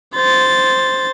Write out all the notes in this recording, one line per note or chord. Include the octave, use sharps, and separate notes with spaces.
C5 A6